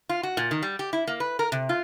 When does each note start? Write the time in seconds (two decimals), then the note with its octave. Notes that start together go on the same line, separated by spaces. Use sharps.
0.09 F4
0.23 F#4
0.37 A#2
0.51 D#3
0.63 G3
0.79 G4
0.93 E4
1.07 A#3
1.20 B4
1.39 A#4
1.52 C3
1.69 F4